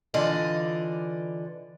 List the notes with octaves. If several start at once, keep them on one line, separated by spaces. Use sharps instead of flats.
D3 E3 F4 D5 D#5